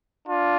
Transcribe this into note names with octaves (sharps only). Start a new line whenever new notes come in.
D4 F4